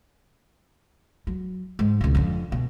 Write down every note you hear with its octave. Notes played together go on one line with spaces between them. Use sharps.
F#3
G#2
C#2 B2
F2 D3
B2